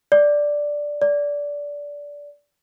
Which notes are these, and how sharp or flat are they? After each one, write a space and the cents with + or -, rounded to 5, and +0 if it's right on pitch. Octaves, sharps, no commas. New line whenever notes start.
D5 +0
D5 -15